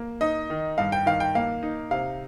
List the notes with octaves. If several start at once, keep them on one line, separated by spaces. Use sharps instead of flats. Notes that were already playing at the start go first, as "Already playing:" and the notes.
Already playing: A#3
D#4 D#5
D#3
G2 F5
G5
D#3 F5
G5
A#3 F5
D#4
C3 F5